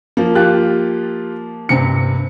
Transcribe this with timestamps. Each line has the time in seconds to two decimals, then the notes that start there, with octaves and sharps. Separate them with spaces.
0.17 F3 A#3
0.35 F4 G4 F#6
1.69 G2 C3 C#7